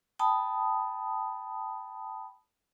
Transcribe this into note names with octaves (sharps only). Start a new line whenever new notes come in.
G5 A5 B5 D#6